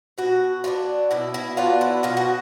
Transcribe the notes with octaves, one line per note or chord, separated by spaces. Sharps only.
B2 F#4
F#3 B3 D4 F4
B2 E4
E4
F#3 B3 D4 F4
E4
B2 F4
F#4